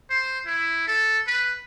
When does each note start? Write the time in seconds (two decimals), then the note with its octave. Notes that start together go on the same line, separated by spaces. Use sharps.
0.10 C5
0.46 E4
0.87 A4
1.27 B4